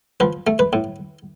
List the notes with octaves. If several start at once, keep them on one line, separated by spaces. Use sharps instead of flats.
F3 B4
A3
B4
A2